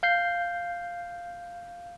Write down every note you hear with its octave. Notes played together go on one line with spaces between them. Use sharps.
F5 G6 C7